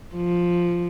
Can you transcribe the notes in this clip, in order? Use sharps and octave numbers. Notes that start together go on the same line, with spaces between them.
F3